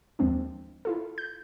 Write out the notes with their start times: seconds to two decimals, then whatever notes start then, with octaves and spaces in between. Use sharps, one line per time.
0.19 D#2 F3 G#3 C4 D4
0.85 E4 F4 A4
1.18 G6